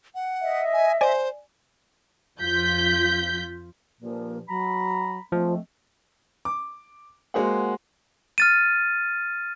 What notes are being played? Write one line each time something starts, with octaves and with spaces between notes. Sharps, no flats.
F#5
D#5 E5
G#5
C5 D5 G#5
F2 F3 F4 G6 B6
G2 A#2 F3 A#3
F#3 A#5 B5
F3 G#3 A3 C4
D6
G#3 A#3 F#4 G#4 C5 F#5
F6 A6 D#7